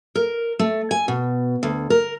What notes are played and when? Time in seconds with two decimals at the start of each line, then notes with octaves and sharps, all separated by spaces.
0.15 A#4
0.59 A3
0.91 G#5
1.08 B2
1.63 D2
1.90 A#4